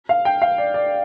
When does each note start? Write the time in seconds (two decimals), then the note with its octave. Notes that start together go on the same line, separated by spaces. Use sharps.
0.09 F5
0.25 G5
0.42 F5
0.58 D5
0.74 D5